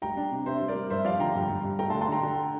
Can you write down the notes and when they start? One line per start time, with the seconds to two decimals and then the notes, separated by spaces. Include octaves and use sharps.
0.02 G3 G5 A#5
0.17 D4
0.31 C3
0.46 C3 C5 E5
0.61 G3
0.68 A#4 D5
0.76 G3
0.90 G2 C5 E5
1.05 F3 D5 F5
1.20 D3 G5 A#5
1.35 G2
1.49 G2
1.64 G2
1.79 A3 G5 A#5
1.90 A5 C6
1.94 D3
2.01 A5 C6
2.08 D3 G5 A#5
2.23 D3